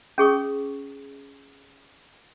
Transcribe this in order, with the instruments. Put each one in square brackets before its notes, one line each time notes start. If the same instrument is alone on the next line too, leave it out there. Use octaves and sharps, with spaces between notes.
[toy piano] C#4 G#4 C#6 D#6